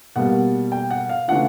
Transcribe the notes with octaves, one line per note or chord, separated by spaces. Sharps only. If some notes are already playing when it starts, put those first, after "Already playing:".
B2 G3 A#3 F#5
G5
F#5
F5
C#3 E3 A3 D4 F4 F#5